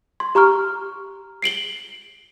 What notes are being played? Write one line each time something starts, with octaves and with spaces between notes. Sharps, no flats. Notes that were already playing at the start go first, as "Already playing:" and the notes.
C6
G4 A#5 C#6 F6
C7 D7 F#7 G7